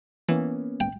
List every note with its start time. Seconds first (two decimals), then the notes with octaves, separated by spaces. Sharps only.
0.29 E3 A#3 B3 C#4
0.80 G5